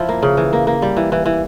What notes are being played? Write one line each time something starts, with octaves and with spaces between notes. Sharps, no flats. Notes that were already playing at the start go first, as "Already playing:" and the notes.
Already playing: F3 E4
A#3
C#3
E3
A#3
A#3
G3
E3
E3
E3